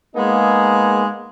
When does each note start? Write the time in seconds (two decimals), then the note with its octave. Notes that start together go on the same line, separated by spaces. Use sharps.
0.16 G#3 A#3 B3 D#4 G#4